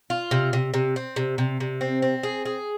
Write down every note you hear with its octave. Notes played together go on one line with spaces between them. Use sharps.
F4
C3
C3
C3
C4
C3
C3
C3
C4
C4
G#4
G#4